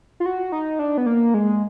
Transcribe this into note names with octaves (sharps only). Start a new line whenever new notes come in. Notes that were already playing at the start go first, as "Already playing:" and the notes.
F4
F#4
D#4
D4
B3
A#3
G#3